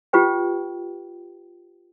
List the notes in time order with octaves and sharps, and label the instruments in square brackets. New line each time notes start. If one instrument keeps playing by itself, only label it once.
[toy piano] F4 G4 B4 G5